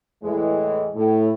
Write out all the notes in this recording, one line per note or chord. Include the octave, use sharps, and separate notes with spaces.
E2 A2 E3 G#3
A2